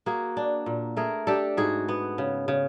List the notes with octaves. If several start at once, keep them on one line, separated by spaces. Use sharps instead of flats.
A#3 F#4 G#4
D4
A#2
A3 G#4 A#4
D4 G4 A4
G#2 F#4 G#4
B3
C#3
C#3